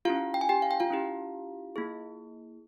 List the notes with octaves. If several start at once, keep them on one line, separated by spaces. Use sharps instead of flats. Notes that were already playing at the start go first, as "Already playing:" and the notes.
C#4 E4 F4 G4 F5
G5
G#5
G4 G5
F5
G5
F4 F5
C#4 E4 G4
A#3 E4 G#4